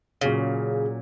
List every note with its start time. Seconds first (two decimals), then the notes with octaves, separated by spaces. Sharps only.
0.21 A#2 C#3 F#3 C#4